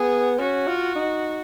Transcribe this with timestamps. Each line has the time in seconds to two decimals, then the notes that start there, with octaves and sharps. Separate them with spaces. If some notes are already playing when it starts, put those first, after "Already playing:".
Already playing: B3 G#4
0.39 C#4 F#4
0.67 F4
0.96 D#4